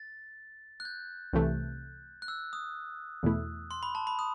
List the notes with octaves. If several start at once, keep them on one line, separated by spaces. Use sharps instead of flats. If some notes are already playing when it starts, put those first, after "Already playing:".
Already playing: A6
F#6
G6
C2 C3 E3 A3
F#6
E6
D#6
E2 B2 A3 E4
C6
B5
A5
B5
D#6